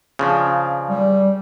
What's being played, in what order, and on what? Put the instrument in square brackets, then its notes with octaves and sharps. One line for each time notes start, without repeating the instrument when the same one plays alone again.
[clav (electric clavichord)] C#3 F3 D4
[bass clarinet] G3